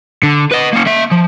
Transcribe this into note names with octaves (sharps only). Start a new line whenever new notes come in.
D3
B4 D#5
A#3 C#4
A#3 E5
F3